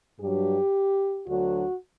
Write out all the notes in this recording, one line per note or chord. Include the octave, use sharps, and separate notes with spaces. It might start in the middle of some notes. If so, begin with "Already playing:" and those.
G2 F#3 G4
D2 D3 F#3 F#4